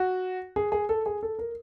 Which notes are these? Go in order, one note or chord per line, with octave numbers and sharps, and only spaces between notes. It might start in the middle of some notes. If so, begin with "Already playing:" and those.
Already playing: F#4
G#4
G#4
A4
G#4
A4
A#4